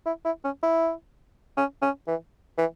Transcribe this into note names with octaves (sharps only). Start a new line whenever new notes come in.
E4
E4
C#4
E4
C#4
C#4
E3
E3